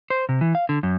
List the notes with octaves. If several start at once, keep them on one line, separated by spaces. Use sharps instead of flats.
C5
C3
E3
F5
D3
F#2